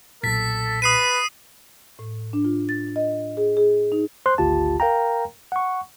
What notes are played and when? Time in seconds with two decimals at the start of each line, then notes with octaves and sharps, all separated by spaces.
0.23 B1 A#2 A4 A6 B6
0.82 B4 D#6 C7 D#7
1.99 A2
2.33 D4
2.44 F4
2.69 A6
2.96 D#5
3.37 G#4
3.57 G#4
3.92 D#4
4.26 C5 C6 F#6
4.38 G#1 D2 F4 G4 A5
4.80 A#4 F5 G5 A#5
5.52 F#5 C#6